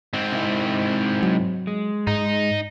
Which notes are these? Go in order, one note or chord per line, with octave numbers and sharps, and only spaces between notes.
G#2 C4
C3 E4
F#3
G#3
G#2 D#4